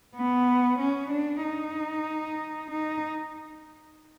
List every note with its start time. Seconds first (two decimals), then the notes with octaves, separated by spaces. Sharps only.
0.15 B3
0.79 C#4
1.11 D4
1.43 D#4
2.71 D#4